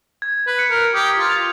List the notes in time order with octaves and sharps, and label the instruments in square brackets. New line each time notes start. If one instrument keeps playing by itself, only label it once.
[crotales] G#6
[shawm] B4
[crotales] C#7
[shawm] A#4
[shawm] G4 [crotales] D#6
[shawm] F4
[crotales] F7